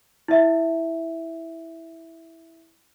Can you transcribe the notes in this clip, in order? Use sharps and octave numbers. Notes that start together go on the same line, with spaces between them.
E4 E5